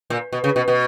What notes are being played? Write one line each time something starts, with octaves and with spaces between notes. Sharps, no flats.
A#2
B2
C#3
B2
B2